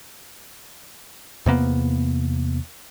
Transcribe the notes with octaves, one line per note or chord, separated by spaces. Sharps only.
E2 C3 A#3 B3